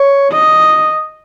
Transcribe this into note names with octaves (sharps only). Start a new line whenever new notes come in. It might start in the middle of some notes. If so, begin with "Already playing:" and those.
Already playing: C#5
D#5